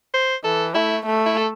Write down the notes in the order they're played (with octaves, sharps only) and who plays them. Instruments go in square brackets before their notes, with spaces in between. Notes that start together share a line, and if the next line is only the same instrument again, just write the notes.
[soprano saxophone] C5
[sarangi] E3 [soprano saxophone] A4
[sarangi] A3 [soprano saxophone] E4
[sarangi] A3
[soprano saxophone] E4
A4